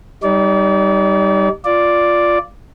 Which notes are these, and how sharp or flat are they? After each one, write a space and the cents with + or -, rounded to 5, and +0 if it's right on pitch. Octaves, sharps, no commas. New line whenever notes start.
G3 +0 D#4 +0 D5 -35
F4 +0 D5 +0